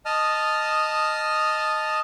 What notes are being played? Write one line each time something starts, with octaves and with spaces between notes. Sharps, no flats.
D#5 A5 D#6 F6